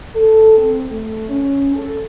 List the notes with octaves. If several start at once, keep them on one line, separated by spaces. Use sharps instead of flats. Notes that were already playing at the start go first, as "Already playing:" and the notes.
A4
C4
A3
C#4
A4